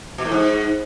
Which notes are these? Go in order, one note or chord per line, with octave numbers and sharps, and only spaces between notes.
B2
A2
G#2